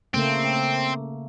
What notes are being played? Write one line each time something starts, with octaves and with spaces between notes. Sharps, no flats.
C#3 A3 A#3 C4